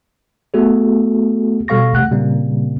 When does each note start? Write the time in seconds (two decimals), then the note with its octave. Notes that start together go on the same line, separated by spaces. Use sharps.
0.54 A3 B3 F#4 G#4 A4
1.68 B2 G3 A4 F5 C#6 A#6
1.93 A1 C3 A3 F#5 F#6
2.11 A#2 C#3 G3 A#3 C4